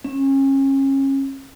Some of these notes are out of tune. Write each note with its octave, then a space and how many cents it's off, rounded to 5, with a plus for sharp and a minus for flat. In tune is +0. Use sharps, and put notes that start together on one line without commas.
C#4 -30